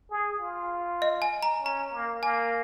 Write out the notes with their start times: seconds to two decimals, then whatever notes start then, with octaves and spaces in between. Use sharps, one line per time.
0.10 G#4
0.40 F4
1.02 D#5
1.22 G#5
1.43 A#5
1.62 C#4 A#5
1.93 A#3
2.23 A#3 G#5